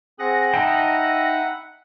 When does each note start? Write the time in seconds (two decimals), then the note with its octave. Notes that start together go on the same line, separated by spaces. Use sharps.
0.19 C4 G#4 F#5 D#6 A#6
0.53 D#4 E5 G5 A5 B5